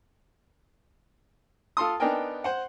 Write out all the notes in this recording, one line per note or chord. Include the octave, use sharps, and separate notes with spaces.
F4 A4 C6 D#6
B3 D4 D#4 A#4 G5 G#5
C5 F#5